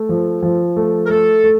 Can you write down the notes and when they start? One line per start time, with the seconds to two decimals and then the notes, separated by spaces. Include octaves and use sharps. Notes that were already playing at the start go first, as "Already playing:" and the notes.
Already playing: A3
0.09 F3
0.42 F3
0.77 A3
1.05 A#4
1.10 A3 A4
1.44 A3